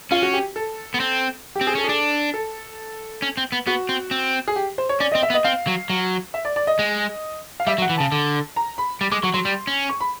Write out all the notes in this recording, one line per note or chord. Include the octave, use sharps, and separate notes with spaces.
C#4 F4
F#4
G4
A4
B3
C4
G4
C4
G#4
C#4 A4
G#4
D4 A4
A4
C#4
C4
B3
B3 F#4
C4
C4
G#4
G4
C5
C#5
C#4 D5
D#5
C4
E5
B3
D#5
C4 F5
F#3
F#3
E5
D5
D5
D#5
G#3
F5
G3 E5
F#3
F#5
E3
C#3 A5
D3
A#5
B5
G3
G#3 D6
F#3 C#6
F#3 C6
G3
C#4
C#6
B5